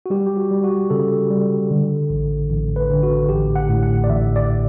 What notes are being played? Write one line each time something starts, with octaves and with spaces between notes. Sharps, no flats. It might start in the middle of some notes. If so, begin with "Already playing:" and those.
F#4
G3 G4
G4
F#4
G3
F#4
C#3 A4
G3
D3
A1
A1
B4
D3
F#4
A1 G4
F#5
A2
F#5
D5
A1 E5
D5